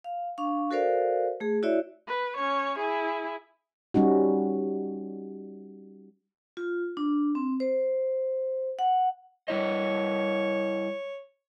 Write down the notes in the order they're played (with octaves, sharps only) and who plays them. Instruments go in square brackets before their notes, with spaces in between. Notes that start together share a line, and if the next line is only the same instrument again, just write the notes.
[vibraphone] F5
D4 F5 C#6
F#4 A4 A#4 C5 D5 F5
A3 G#4
E4 F#4 C#5 D5 E5
[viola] B4
C#4 C#5
E4 G#4
[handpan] G3 C#4 D#4 F#4
[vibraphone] F4
D4
C4
C5
F#5
[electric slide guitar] G3 E4 D#5 [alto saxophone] C#5